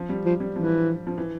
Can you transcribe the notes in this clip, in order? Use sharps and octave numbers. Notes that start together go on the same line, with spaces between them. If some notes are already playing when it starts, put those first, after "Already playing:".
Already playing: F3
G3
F3
G3
E3 F3
F3
E3